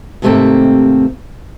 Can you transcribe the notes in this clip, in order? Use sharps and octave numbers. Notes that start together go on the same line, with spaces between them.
D#2 G#2 C3 A3 A#3 C4